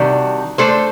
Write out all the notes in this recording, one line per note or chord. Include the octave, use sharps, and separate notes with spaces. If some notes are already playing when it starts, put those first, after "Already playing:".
Already playing: C3 D#3 G3 D4 F#4
A3 D4 A4 C5